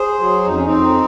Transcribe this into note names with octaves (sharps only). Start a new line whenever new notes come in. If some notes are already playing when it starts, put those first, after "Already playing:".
Already playing: G#4 C5
F#3
F2 D#4
C#4
F2 C4 D#4